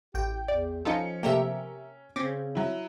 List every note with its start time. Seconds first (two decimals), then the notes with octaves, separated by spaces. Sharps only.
0.14 A1 G4 G5
0.48 E2 D5
0.85 F3 C#4 D#4 F4 A4 C#7
1.23 C3 A3 A#3 G4 A#4 E5
2.16 C#3 C4 C#4 D6
2.55 F#3 E4